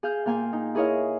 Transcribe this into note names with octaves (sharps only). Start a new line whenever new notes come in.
G#4 F5 G6
A#2 A#3 F5 G5 G#5
D#4
E4 G#4 A#4 C#5 D#5 F5